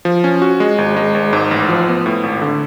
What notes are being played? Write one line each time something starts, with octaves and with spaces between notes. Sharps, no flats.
F3
C#4
F#4
G#3
G#1
G#3
G#1
G#2
A1
F3
B3
A2
G#1
D3